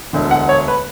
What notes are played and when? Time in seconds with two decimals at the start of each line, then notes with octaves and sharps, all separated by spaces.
0.13 E1 D2 D3
0.31 F#5
0.49 C#5
0.68 B4